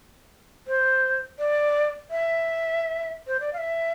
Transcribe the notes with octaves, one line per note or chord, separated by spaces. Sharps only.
C5
D5
E5
C5
D5
F5
E5